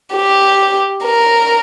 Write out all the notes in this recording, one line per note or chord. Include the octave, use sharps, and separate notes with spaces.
G4
A#4